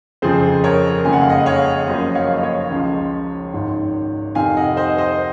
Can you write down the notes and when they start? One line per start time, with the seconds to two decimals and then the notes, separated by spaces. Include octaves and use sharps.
0.22 F2 C#3 F3 G#4 C5
0.64 A#4 C#5
1.05 F#1 F2 C#3 G#3 G#5
1.13 F#5
1.21 F5
1.30 D#5 F#5
1.46 C#5 F5
1.87 F#1 F#2 F3 A#3 C#4 C5 D#5
2.15 C#5 F5
2.36 D#5
2.42 C#5 F5
2.70 C#2 C#3 F3
3.53 G#1 G#2 D#3
4.35 F2 C3 D#3 F5 G#5
4.57 D#5 F#5
4.77 C5 D#5
4.98 C5 D#5